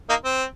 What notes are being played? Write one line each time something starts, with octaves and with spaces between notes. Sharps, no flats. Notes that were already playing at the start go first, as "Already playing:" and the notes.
A#3 D#4
C4